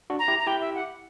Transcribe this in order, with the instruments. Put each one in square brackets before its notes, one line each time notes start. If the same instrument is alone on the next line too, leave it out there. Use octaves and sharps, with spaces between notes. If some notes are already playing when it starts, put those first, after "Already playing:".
[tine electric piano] D4 F#4
[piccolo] A#5
[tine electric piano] E4 G4
[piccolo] A#5
[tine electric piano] E4 G4 [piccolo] G5
[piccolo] E5
F#5